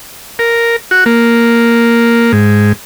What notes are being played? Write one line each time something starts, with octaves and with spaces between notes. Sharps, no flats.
A#4
F#4
A#3
G#2